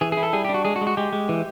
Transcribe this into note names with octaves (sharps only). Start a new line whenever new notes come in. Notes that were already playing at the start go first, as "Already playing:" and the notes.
E3 G#4
G#4
E4
A4
G3 G#4
G4
D4
F#4
G#3 G#4
F#4
G#3
F#4
G#3 G4
G#3
E3